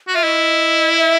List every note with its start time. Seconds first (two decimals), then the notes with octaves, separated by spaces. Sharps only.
0.07 F#4
0.14 F4 E5
0.23 E4 D#5
0.97 E5